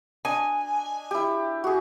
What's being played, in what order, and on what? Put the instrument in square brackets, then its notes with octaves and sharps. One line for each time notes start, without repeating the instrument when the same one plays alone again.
[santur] D4 D#5 [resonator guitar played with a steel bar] G#5
[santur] E4 G4
F#4 G#4